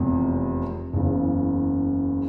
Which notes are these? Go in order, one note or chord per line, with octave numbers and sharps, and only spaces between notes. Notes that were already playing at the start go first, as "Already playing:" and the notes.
Already playing: F1 E2 C3 F3 G#3
F#1 E2 C#3